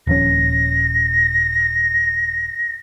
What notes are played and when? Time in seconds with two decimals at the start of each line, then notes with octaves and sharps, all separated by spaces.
0.07 D#1 F3 C#4 A#6